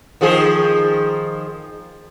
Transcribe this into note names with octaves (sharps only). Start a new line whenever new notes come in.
D#3 F3 G#4